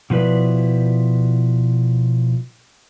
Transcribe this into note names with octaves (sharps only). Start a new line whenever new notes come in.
B2 F3 E4 B4 D5